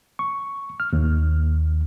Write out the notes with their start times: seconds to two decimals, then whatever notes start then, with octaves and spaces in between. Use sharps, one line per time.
0.19 C#6
0.80 F6
0.93 D#2